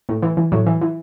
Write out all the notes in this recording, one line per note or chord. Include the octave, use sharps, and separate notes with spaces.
A2
E3
E3
A2 F#3
E3
E3